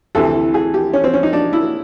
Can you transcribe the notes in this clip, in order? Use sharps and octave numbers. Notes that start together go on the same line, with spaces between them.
D2 C3 E3 A4
G#4
G4
C#4
C4
C#4
D#4
D4
E4